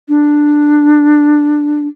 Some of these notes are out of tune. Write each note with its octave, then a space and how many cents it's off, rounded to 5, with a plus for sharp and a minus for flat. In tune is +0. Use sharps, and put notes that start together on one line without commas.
D4 +10